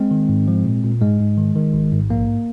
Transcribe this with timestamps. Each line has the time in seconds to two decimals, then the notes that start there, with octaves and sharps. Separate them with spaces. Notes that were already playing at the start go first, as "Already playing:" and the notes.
Already playing: G#3 C4
0.11 D#3
0.29 G#2
0.48 F3
0.65 A#2
0.84 A#2
1.01 G#2 G#3
1.20 G#2
1.38 D#3
1.55 D#3
1.74 G#1
1.92 G#2
2.10 A#1 A#3